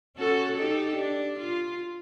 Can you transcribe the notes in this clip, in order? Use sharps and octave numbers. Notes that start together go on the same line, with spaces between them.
C#4 F#4 A4
D#4 G4 A4
D4
F4